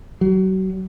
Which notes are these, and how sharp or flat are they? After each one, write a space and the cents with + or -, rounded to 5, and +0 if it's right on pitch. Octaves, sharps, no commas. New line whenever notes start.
F#3 +35